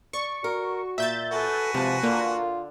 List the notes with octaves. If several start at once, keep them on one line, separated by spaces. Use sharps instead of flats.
D5 C#6
F#4 A#4
A#2 E5 G6 A6
F#4 A4 B4 G#5
C3 F3 G#3 A5
D3 A#3 F4